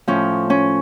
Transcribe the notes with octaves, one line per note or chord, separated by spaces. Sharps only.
A2 F3 C#4
C#4